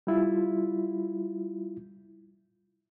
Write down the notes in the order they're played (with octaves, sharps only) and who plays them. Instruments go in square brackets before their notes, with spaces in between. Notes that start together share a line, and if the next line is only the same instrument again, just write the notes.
[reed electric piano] G3 E4 F4